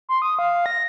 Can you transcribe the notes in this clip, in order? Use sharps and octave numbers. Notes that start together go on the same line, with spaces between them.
C6
D#6
F5
A#6